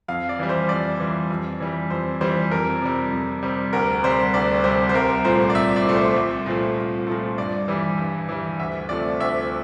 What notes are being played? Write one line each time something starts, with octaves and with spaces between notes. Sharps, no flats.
F2 F5
D5
E3 G3
C5
F2 D5
E3 G3
F2
E3 G3
F2 C5
E3 G3 C5
F2 A#4
C3 G3
F2
C3 G3
D2 A#4
C3 G3 C5
D2 D5
C3 G3 C5
C5
C2 A#4
A#2 F3 A3 C5
D5
C2 E5
D5
A#2 F3 A3
C5
C2
A#2 F3 A3
C2
A#2 F3 A3
G2 D5
E3 G3
G2
E3 G3
D2 E5
C3 F3 A3 D5
D2 E5